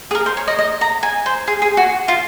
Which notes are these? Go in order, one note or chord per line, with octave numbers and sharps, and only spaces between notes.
G#4
A#4
C5
C#5
D#5
D#5
A#5
G#5
C5
G#4
G#4
F#4
F4